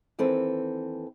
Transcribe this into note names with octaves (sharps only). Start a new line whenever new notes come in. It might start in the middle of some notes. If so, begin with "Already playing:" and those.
D#2 E3 C4 A4 B4